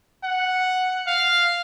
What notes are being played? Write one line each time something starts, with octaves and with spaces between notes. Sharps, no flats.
F#5
F5